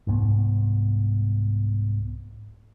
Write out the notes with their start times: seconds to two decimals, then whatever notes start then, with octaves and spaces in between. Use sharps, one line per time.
0.07 C2 G#2 B3